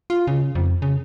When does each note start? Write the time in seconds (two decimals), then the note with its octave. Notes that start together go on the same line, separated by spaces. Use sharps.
0.10 F4
0.27 C#3
0.55 F2
0.82 C#3